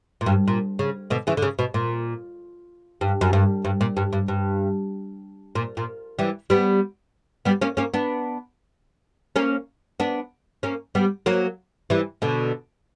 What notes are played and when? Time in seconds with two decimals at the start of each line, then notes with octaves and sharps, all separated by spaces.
0.21 A#2
0.26 G2
0.48 A#2
0.79 C#3
1.10 B2 D3
1.27 C#3 E3
1.37 D3
1.42 C#3
1.59 B2
1.74 A#2
3.01 G2
3.21 F#2
3.33 G2
3.65 G2
3.81 A#2
3.97 G2
4.13 G2
4.28 G2
5.55 A#2
5.77 A#2
6.19 E3 G3
6.50 G3 B3
7.45 G3 B3
7.61 A#3 C#4
7.77 A#3 C#4
7.94 B3 D4
9.36 A#3 C#4
10.00 B3 D4
10.63 A#3 C#4
10.95 G3 B3
11.26 F#3 A#3
11.90 E3 G3
12.22 B2 D3